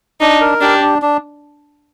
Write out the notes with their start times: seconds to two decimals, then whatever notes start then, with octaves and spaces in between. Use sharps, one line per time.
0.21 D4 D#4
0.41 A#4
0.61 D4 G4
0.82 D4
1.02 D4